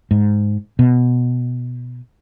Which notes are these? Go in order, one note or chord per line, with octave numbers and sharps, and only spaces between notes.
G#2
B2